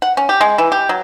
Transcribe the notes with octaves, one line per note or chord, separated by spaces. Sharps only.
F#5
C#4
G4
G#3
E3
G4
F#3